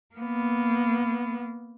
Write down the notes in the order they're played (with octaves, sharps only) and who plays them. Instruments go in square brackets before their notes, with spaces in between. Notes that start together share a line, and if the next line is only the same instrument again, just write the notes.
[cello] A#3 B3